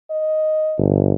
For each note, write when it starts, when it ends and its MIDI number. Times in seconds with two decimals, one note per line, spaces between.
0.11 0.82 75
0.78 1.13 31